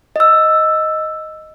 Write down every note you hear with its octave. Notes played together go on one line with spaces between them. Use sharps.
D#5 E6